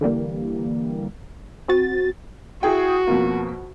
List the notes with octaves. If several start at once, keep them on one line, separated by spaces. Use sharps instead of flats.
D3 E3 G3 A#3
C4 F#4 A6
E4 F#4 G#4 G5
F2 B2 A#3